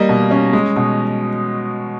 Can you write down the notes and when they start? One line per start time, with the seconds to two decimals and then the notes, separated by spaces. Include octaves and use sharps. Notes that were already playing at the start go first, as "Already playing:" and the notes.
Already playing: G3 A#3 D#5
0.09 B2
0.31 C#4
0.53 G#3
0.76 B2